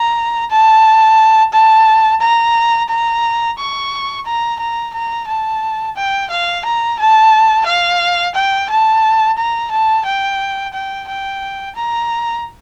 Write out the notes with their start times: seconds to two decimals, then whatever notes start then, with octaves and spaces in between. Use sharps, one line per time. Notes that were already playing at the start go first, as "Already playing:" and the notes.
Already playing: A#5
0.50 A5
1.53 A5
2.21 A#5
2.89 A#5
3.58 C#6
4.26 A#5
4.60 A#5
4.94 A#5
5.27 A5
5.96 G5
6.30 F5
6.65 A#5
6.99 A5
7.66 F5
8.35 G5
8.70 A5
9.38 A#5
9.71 A5
10.05 G5
10.73 G5
11.08 G5
11.76 A#5